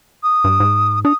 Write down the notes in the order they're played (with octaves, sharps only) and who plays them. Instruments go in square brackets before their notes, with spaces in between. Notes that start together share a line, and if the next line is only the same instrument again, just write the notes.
[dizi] D#6
[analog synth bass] G2
G#2
[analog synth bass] D4 [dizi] D#6